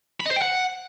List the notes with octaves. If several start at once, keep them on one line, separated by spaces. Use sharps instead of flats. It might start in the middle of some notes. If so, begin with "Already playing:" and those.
B5
D#5
C5
G5
F#5